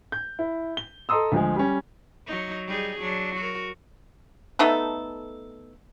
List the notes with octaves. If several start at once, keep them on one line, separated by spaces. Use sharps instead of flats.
G6
E4
G7
A4 D#5 A#5 C6 D#6 E6
D2 F3 G#3
G3 C#4
F#3 D#4
G3 D#4 G#4
F#3 D4
F#4 A#4
A3 B3 D#4 A4